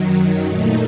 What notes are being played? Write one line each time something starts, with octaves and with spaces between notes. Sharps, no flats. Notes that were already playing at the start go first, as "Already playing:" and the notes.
Already playing: F#2 D#3 F#3
A#2 A3 D#4